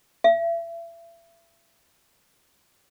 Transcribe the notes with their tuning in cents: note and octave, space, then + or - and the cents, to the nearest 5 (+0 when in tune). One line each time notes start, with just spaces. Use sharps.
E5 +35